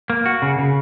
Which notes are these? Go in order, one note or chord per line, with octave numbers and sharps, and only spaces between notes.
A#3
F#4
C#3
C#3